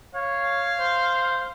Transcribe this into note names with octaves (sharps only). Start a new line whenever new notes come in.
C#5 F5
C5